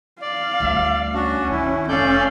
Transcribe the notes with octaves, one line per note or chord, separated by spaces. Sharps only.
D5 F5
D2 G3
C#4 D4 F#4
D#3 E4
F1 C#4 A4 D5 F5 G6